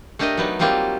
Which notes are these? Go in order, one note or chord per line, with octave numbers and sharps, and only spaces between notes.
A3 D4 G4 A#4 D#5
F#3 B3 D#4
F#3 G3 A#3 C4 F4 G4